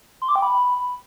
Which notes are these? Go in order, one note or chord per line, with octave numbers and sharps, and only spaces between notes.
C6
D6
G5
B5